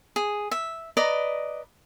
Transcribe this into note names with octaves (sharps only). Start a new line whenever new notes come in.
G#4
E5
B4 D5 D#5 A#5